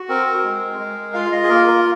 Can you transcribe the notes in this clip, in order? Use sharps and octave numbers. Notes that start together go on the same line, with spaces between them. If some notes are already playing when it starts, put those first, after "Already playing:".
Already playing: F#4
C4 A#4
A#4
G#3
G#3
F4 F5
D#5
G#4
A#3 A#4
A#4